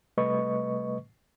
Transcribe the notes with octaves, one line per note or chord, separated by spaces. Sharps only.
C3 G3 A3 B4 D#5 C#6